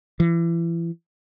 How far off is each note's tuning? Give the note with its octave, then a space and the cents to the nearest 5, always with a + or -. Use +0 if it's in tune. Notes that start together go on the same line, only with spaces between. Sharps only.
E3 +30